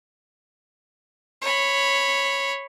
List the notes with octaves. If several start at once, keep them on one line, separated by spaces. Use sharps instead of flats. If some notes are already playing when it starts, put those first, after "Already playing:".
C#5 B5